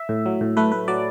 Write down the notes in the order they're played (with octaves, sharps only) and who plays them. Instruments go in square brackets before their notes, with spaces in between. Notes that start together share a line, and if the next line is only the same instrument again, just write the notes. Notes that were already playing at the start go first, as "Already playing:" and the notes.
Already playing: [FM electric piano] E5
A2
F#3
A2
A3 B4
A2 B4
F#3 D5